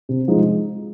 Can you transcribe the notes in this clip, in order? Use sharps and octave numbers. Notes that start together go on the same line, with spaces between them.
C3
F3 G#3 D#4